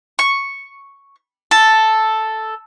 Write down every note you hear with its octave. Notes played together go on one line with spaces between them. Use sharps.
C#6
A4